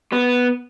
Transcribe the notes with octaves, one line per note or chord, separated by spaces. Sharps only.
B3